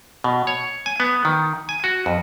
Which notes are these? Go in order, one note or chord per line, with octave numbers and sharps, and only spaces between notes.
B2
C#5
G#5
B3
D#3
G#5
F#4
F2